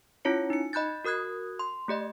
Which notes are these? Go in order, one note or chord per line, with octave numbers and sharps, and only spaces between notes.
C#4 E4 F4 C#5 C#7
D#4 C#7
D#5 B5 F#6 G6 A6
F#4 A#4 D#6 F#6 G#6
C6
A3 G4 D5 D#5